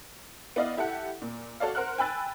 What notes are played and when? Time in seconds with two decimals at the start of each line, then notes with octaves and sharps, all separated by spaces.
0.56 B3 E4 D5 D#5 F5
0.77 E4 G4 A4 F#5
1.22 A#2
1.60 F#4 A4 C#5 D5 F5
1.75 A#4 C5 F#5 F6 F#6
1.98 G5 G#5 B5 E6 F#6 A6